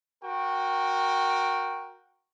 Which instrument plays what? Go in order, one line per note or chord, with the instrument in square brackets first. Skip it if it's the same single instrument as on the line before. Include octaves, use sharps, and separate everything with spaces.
[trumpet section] F#4 A#4 G5